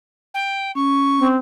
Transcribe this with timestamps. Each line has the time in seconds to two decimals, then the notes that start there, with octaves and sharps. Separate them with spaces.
0.34 G5
0.75 C#4 C#6
1.19 C4